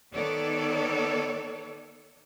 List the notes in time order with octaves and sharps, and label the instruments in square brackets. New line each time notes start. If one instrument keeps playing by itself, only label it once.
[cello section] D#3 B3 A4 C#5 D5